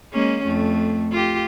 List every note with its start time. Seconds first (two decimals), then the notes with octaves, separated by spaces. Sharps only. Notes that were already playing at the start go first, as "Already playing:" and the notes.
0.13 G#3 A#3 C#4
0.45 F2 A3
1.12 F4 G4